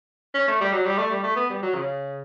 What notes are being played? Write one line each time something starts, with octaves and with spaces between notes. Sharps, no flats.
C#4
A3
G3
F#3
G3
A3
G3
A3
B3
G3
F#3
C#3